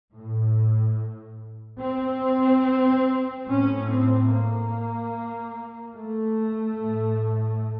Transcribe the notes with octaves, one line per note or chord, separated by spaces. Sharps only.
A2
C4
A2 C#4
C4
A#3
A3
A2